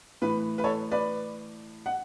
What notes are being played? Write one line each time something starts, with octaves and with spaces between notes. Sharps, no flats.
A2 E3 B4
B4
A4 C#5
B4 D5
F#5